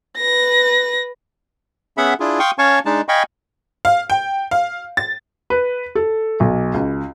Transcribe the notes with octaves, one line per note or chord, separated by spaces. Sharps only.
B4 A#6
B3 C#4 G#4 E5 F#5 B5
D4 E4 F4 G#4
F5 G5 C6 C#6 D#6
C#4 C#5 F5 G#5 A5 C#6
G#3 D4 D#4 A5
D#5 F5 G5 G#5 B5 C#6
F5
G5
F5
A6
B4
A4
B1
C#2